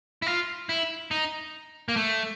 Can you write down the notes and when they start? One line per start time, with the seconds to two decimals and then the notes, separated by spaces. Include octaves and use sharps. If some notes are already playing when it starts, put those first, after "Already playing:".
0.22 E4
0.27 F4
0.69 E4
1.11 D#4
1.89 A#3
1.96 A3